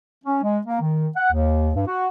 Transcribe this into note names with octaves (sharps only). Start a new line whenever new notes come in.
C#4
G#3
A#3
D#3
F#5
D#2
G2
F#4